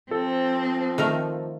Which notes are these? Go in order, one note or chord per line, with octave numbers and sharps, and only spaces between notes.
F3 C4 A4
D#3 A3 A#4